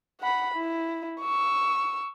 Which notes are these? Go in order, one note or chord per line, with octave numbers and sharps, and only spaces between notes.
F#5 B5
E4
C#6 E6